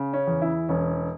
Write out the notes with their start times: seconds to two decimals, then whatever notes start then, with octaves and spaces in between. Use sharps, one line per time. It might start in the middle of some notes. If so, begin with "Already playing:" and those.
Already playing: C#3
0.13 C#4
0.27 E2
0.42 E4
0.69 E1 C#4